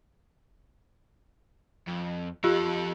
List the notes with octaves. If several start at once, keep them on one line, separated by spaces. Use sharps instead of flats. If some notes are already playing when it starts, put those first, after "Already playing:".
F2
F3 F4 G4 A4